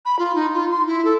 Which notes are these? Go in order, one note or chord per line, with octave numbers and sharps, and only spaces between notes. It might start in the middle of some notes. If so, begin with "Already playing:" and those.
B5
F4
D#4
F4
C6
E4
A4